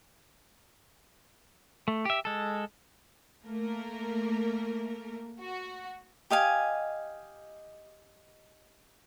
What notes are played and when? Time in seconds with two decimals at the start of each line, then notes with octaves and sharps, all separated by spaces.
1.88 A3
2.05 G4 E5
2.25 G#3 A4
3.45 A3 A#3 A#4
5.40 F#4
6.30 G4 D#5 F5 G#5